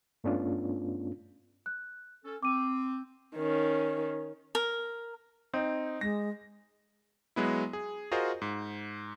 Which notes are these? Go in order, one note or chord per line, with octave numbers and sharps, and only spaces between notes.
G2 A3 B3 C#4 D4 F4
F#6
C#4 A4
C4 D6 D#7
D#3 C#4
A#4
C4 D#4
G#3 A#6
F#3 G#3 B3 E4
G#4
F4 F#4 G#4 A#4 C5 D#5
G#2